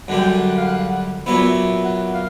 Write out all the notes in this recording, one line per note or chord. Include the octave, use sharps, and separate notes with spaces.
F#2 D3 G3 F#5
G5
F#5
F5
F#5
A#2 F#3 B3 E4 E5
F#5
F5